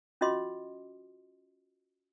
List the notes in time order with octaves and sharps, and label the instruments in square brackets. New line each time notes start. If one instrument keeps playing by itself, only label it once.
[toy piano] C#4 F4 F#4 D#5 C6 D6